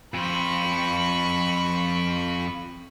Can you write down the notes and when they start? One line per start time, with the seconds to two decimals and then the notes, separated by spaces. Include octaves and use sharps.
0.14 F2 C5 B5 C#6